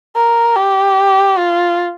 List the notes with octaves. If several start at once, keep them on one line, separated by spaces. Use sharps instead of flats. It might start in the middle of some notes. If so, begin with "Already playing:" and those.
A#4
G4
F4